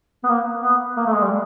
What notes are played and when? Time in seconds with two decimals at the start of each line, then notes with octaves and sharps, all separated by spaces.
0.24 B3
0.29 A#3
0.63 B3
0.97 A#3
1.06 A3
1.15 G#3
1.23 G3